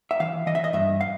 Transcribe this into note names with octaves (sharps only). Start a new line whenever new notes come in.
E5
E3 F5
E3 D#5
E5
D#5
G2 E5
F5